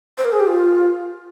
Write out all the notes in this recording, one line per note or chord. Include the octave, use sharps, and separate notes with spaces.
C5
A#4
G#4
G4
F4